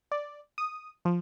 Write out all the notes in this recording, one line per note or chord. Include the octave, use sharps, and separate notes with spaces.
D5
D#6
F3